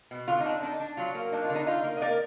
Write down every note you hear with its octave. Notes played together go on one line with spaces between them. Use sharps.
B2
D3 F4
D#4
D4
D4 D#4
D4
F#3 F4
A#3
D4 D#4
F4
D3
D#4
D#4 F4
A#3
D#5
A#3 A#4 D5